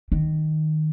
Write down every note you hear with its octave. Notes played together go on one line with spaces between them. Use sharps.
D#3